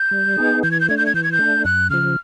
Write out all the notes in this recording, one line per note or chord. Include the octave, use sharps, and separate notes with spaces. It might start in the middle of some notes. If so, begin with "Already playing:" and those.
Already playing: G6
G3
B3 D#4 G#4
E3 G6
G#6
G6
A3 D4 G#6
G6
G#6
E3 G6
G#6
G6
A3 D4
F#2 F#6
C#3 F3 F6